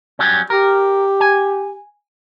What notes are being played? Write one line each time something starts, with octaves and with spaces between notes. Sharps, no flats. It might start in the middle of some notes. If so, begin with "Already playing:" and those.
F#3 G3 C#4
G4 A#4
G#5